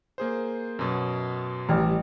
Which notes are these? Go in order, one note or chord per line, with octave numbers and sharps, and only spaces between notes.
A#3 G#4 C5
F#2 B2
A1 G3 F6